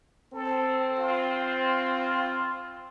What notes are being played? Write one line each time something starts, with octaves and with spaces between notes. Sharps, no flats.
C4 A4
F4